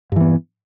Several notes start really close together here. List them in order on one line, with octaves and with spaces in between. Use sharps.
G2 E3 B3